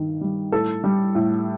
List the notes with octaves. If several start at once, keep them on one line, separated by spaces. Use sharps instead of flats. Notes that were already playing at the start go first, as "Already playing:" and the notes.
Already playing: G2 D#3
G3
A2 A4
G3
A2